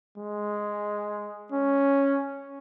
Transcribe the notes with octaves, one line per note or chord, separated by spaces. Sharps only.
G#3
C#4